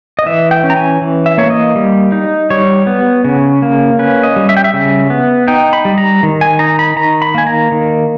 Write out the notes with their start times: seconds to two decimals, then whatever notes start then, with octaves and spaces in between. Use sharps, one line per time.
0.19 D#5
0.26 E3 E5
0.51 G5
0.64 C#4
0.70 A#5
0.76 G#5
1.02 E3
1.26 E5
1.38 A#3 C#5
1.50 D#5
1.76 G3
2.12 D#4
2.50 G3 C#5
2.87 B3
3.25 C#3
3.62 A#3
3.99 C#4 B4
4.23 D#5
4.36 G3
4.49 E5
4.57 G5
4.64 E5
4.74 C#3
5.10 B3
5.48 D#4 G5
5.73 B5
5.85 G3
5.98 A#5
6.23 D#3
6.41 G#5
6.59 D#4 A#5
6.79 B5
6.96 D#3 A#5
7.22 B5
7.34 A#3 G#5
7.47 A#5
7.72 D#3